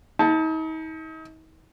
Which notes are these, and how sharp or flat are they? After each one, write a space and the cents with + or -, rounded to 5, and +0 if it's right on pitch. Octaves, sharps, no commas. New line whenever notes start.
D#4 +40 A5 +0